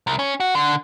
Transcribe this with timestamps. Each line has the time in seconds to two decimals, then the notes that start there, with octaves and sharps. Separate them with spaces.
0.07 C2
0.19 C#4
0.40 F#4
0.55 D3